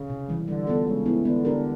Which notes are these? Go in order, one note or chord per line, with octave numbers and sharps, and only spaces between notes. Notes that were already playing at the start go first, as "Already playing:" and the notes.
Already playing: C#3
C3
E3 G3
D3 G3
B3 D4 F4 A4
C#3 G#3
B3 E4
D3 B3
D4 G4 A#4